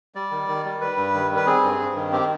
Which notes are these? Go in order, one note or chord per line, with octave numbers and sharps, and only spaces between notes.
G3 D5
D#3
D#3
G3
G3 B4
G2
D#3
G3
B4
C4 G#4
G2
G2
D#3
C4 G4